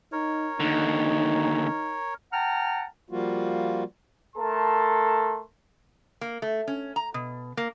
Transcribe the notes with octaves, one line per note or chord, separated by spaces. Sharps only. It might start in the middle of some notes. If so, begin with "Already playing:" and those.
D#4 A#4 C#5
D#2 D3 D#4
F#5 G5 A5 A#5 F6
F3 G3 A#3 F4 F#4
A3 A4 A#4 A5 C6
A#3
A3
C#4
A#5
B2
A#3